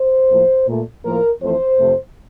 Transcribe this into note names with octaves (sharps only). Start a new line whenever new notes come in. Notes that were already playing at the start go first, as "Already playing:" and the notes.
Already playing: C5
A2 F3 A#3
A#2 A3
A2 F3 A#3 A#4
F2 E3 A3 C5
F2 C3 F3 A3